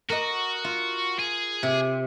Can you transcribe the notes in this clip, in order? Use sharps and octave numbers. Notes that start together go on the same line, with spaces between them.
F#4 A#4 D#5
F4
G#4
C3